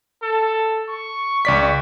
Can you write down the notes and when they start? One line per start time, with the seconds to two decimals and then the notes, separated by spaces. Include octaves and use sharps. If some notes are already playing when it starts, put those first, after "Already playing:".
0.23 A4
0.89 C#6
1.45 C#2 D5 B6